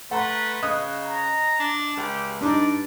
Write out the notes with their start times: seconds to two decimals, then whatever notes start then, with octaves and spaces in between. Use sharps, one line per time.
0.11 A3 B4 F#5 A#5 C6
0.63 C#3 D#5 D#6 F#6
1.01 A#5
1.60 D4
1.97 C#2 G4
2.41 G2 D4 D#4 D5